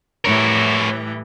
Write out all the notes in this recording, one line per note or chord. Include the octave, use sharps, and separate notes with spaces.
A2 E3 G3 A#4 C#5